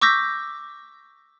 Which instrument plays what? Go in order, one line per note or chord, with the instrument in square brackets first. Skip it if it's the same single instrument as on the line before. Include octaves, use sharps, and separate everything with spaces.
[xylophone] C#6 D6 E6 G6 A#6 B6